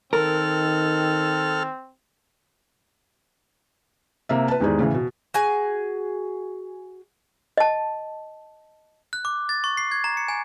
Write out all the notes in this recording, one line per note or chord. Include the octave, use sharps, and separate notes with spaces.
D#3 C4 A4 A#4 F6
C3 A#3 E5
B4 A5
E2 G#2 D#3 G4 G#4 D5
A2 C#3 E3
B2
F#4 G#4 G#5
D#5 A5
F#6
D6
A6
C#6
C7
G#6
A#5
C#7
G#5